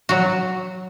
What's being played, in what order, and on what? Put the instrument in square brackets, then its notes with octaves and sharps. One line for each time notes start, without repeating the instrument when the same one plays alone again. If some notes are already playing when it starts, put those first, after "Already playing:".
[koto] F#3 F#4